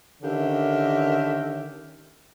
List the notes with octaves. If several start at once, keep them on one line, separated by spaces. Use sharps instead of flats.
D3 D#3 C#4 G4 A#4 E5